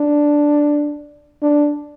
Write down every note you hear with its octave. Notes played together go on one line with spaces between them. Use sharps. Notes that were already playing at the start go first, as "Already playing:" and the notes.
Already playing: D4
D4